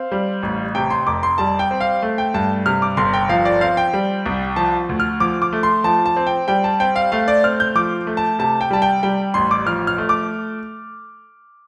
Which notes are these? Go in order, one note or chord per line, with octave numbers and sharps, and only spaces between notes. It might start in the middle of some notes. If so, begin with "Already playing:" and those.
Already playing: C4 F5
G3
A1
C3 G5
C6
F1 D6
C6
G3 A5
G5
C4
F5
A3
G5
G2 A5
C3 F6
D6
G1 C6
G5
F3 F5
D5
C4 F5
G5
G3
C2
F3 A5
D2
F6
F3 D6
D6
A3
C6
F3 A5
A5
C4
G5
G3 G5
A5
C4 G5
F5
A3 F5
D5
C4 F6
G6
F3 D6
A3
A5
C3 A5
G5
G3 A5
G5
G3 G5
A1 C6
D6
F3 F6
F6
A3
D6